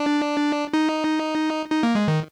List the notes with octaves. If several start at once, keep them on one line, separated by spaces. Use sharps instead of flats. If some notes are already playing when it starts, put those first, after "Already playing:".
Already playing: D4
D#4
D#4
A#3
G#3
D#3